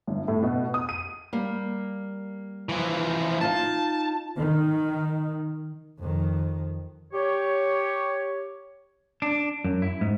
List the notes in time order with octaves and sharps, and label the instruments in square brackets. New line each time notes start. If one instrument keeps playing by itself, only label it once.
[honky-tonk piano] G1
A2
B2
D#6
D#7
[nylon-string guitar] G3 A#3
[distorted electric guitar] E3 F3
[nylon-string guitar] D#4 F4 D#5 [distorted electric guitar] A5
[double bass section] D#3
[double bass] F2 D#3
[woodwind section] G4 C#5
[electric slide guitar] D4
F#2
E4
G#2